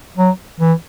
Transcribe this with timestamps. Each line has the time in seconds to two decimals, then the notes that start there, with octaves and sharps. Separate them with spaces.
0.18 F#3
0.60 E3